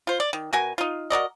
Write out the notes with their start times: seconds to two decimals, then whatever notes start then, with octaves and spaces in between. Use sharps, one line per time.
0.07 F4 C5
0.20 D5
0.33 D#3
0.53 B2 F#4 A#4 G#5
0.78 D#4 F4
1.10 F#4 A#4 D5 D#5